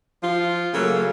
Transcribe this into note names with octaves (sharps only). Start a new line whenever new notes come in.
F3 F4
C#3 F#3 A3 A#3